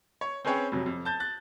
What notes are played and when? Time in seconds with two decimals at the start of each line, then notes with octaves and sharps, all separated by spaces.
0.21 C#5
0.45 C4 C#4 G#4 B4 C#5 G5
0.72 F2 C3 F#3
0.86 F2
1.05 A5 G6 A6
1.20 F#6 A6